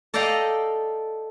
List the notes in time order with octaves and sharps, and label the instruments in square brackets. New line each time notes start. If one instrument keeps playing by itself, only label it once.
[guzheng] A4 D5 D#5 F5 G5 A#5